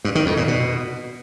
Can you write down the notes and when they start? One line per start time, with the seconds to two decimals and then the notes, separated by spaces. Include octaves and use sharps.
0.05 G2
0.15 D#3
0.26 F2
0.37 A#2
0.48 B2